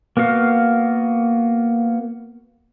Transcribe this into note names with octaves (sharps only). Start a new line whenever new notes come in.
A#3 B3 F#4 F5